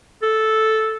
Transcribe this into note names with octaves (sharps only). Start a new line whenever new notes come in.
A4